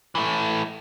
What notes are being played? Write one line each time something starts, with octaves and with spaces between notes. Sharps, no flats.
E3 A3